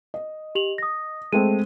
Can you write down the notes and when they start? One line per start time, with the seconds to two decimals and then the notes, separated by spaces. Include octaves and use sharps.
0.14 D#5
0.55 G4 F7 F#7
0.78 D#6 A#6
1.33 G#3 A3 C4 D#7